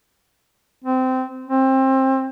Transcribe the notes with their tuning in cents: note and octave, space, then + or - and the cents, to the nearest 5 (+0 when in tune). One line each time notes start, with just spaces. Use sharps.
C4 -20
C4 +25